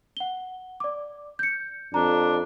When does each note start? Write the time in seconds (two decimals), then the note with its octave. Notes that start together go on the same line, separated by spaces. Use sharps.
0.17 F#5 G7
0.80 D5 D6
1.39 G6 C#7
1.94 F2 D4 A#5